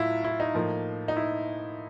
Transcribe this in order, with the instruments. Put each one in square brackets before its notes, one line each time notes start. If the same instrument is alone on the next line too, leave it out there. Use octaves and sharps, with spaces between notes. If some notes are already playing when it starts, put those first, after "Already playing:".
Already playing: [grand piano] A2 F#3 E4 F4
E4
D#4
A2 F3 A#3
D#4
E4